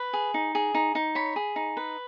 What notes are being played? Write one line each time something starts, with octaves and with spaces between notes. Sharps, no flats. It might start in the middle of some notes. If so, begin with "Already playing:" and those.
Already playing: B4
G#4
D#4
G#4
D#4
D#4
C#5 B5
G#4
D#4
B4